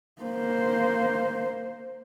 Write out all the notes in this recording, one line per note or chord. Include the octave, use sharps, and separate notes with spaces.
A#3 C5